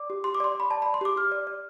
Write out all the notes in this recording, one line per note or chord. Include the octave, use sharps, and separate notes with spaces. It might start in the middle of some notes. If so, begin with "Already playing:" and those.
Already playing: D5 D6
G4
G4 C6
D6
D5 C6
D5 B5
D5 A5
D5 B5
C6
G4 D6
G4 F6
D5
D5